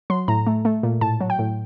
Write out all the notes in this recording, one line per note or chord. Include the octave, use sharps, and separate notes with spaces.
F#3 C6
A2 A#5
A3
A3
A#2
A2 A5
F#3
G5
A2